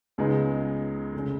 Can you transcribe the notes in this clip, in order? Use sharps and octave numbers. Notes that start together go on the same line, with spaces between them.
C#2 C#3 G#3 B3 D#4
F1
C#3